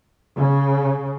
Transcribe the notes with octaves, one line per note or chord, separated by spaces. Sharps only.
C#3